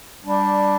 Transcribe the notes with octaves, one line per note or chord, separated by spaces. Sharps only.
G3 D4